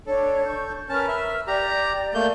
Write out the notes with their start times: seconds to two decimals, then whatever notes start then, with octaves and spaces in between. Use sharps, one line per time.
0.07 D4 A4 C#5
0.46 C#6 G6
0.89 C#4 A#4 B4 A5 F6
1.08 E5
1.47 G4 D5 A#5
2.14 A3 A#3 G6